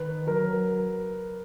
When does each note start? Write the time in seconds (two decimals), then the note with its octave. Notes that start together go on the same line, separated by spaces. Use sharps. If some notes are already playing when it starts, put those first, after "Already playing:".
Already playing: D#3 B4
0.27 F#3 A#4